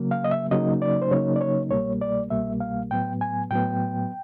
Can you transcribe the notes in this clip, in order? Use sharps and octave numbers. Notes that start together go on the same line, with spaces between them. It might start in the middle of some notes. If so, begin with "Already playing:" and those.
Already playing: C#3 F#3 A#3
F5
D#5
E5
C#3 F#3 A#3 D#4 D#5
D5
C5
C#3 F#3 A#3 D#4 C#5
D5
C#5
C2 B2 G3 A#3 C#5
D5
C2 B2 G3 A#3 E5
F5
A2 F#3 B3 G5
G#5
A2 F#3 B3 G5